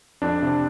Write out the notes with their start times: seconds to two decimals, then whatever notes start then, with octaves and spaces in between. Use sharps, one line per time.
0.22 F2 D4
0.42 C3